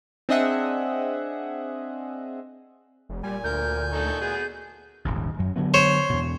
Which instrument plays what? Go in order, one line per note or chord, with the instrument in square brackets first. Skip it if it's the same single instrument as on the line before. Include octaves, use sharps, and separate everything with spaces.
[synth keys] C4 D4 G#4 D#5 E5 F#5
[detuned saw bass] F1
[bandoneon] A#2 G#5 [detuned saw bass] G3
[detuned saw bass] D2 [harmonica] A#4 [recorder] G6
[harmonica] D#4 A4 C#6
B3 F#4 G#4
[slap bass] D#1 G#1 D#2
F#2 F#3
D3 F#3 B3
[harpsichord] C5 C#5
[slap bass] E2 B2